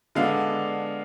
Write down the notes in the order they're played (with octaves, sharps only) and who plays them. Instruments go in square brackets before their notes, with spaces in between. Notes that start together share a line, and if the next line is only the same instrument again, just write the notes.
[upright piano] D3 G#3 B3 D4 F5